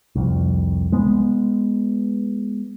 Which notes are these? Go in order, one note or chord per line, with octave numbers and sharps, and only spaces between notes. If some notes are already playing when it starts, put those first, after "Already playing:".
C2 F2
G#3 B3